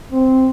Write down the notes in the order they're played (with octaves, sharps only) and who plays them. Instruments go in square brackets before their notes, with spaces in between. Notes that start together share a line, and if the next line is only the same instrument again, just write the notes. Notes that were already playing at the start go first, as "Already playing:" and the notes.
[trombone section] C4